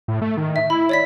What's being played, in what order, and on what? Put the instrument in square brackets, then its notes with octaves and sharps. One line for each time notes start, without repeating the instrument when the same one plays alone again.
[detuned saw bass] A2
A3
D#3
[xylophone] E5
[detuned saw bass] E4 [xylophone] B5
[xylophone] C#5 D5 B6